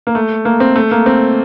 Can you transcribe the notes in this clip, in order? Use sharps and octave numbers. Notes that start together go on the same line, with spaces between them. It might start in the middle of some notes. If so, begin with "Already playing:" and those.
A#3
A3
A#3
C4
A3
A#3
C4